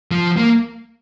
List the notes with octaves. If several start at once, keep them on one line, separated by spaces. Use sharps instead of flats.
F3
A#3